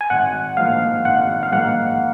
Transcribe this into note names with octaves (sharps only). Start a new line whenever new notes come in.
G#5
G#1 F#5
G#2 F3 A#3 F5
G#1 F#5
F5
G#2 F3 A#3 F#5